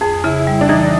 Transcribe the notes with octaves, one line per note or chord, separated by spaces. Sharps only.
F2 G#4
C#3 E4
G3
D4
E3 D#4